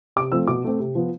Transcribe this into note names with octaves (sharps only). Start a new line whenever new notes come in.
C3 D6
F3 A3 C4 E6
B2 D6
A3 C4
C3
F3 B3